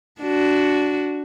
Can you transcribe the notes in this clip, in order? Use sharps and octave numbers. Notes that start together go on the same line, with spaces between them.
D4 F#4